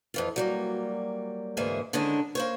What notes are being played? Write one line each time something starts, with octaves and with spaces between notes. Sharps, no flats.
F2 E3 F4
F#3 G3 A#3
D2 G#2 E3 A#3 G#4 E5
D3 D#3 G#3 C#4 D4 E4
A#3 C5 C#5